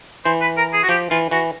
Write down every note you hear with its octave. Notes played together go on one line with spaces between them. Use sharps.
E3 C5
B4
A#4
G#4
F#4
F3 G4
E3 F4
E3 F#4